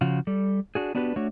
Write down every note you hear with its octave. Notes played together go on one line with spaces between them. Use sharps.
C#3 F3 F4 F#4
G3 A4
D4 F#4 G#4
B3 D4 F#4 G4 B4
A3 D4 F#4 C#5